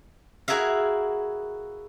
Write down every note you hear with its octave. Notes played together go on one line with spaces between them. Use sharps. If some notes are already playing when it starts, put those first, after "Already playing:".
E4 F#4 G#4 A#4 E5 F5